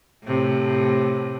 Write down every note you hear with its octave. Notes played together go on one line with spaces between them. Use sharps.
A2 C3